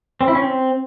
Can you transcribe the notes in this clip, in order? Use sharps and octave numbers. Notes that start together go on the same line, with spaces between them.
C4
E4
C#4
C4